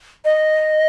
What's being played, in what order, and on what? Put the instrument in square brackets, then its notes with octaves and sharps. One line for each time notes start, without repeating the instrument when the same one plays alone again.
[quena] D#5